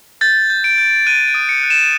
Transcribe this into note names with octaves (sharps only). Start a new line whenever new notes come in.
G6 A6
G6
D7
G6
F#6 D#7
D7
D#6
C#7
F#6
E7